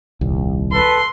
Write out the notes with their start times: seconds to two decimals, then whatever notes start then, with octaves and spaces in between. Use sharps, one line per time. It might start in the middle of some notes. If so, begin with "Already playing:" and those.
0.21 D#1 C2
0.73 A4 B4 C6